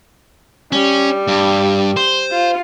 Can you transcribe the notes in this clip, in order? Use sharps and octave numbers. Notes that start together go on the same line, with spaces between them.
G3 C#4
G2
C5
F4